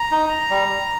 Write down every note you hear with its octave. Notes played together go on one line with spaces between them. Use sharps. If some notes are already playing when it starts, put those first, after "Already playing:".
Already playing: A#5
D#4
G3